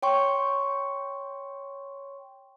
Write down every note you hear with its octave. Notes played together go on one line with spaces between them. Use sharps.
C#5 G5 C6 C#6